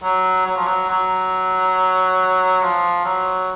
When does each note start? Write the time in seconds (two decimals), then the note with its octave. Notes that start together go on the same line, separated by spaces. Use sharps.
0.03 F#3
0.46 F#3
0.56 F3
0.66 F#3
0.89 F#3
2.62 F3
3.05 F#3